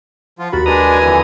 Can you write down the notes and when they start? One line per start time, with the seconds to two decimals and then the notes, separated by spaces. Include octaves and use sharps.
0.39 F3 F4 F#5
0.52 D#2 F#4 A#4 B5 A6
0.66 G#3 D4 B4 D5 G#5 A#5 D#6
1.00 F2 D3 E3